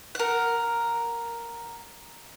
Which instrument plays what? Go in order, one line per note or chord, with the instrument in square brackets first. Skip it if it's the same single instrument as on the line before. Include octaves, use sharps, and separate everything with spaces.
[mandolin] A#4 F#5